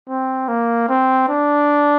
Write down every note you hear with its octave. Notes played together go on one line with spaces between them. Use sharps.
C4
A#3
C4
D4